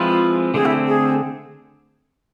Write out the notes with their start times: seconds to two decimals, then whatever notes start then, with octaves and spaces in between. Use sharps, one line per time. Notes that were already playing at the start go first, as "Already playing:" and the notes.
Already playing: F3 G#3 C4 E4 F4 B4
0.54 D3 A3 C4 G#4
0.65 E4
0.87 G#4